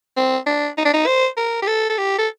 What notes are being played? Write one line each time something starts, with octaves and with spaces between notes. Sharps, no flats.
C4
D4
D#4
D4
D#4
C5
A#4
G4
A4
A4
G4
A4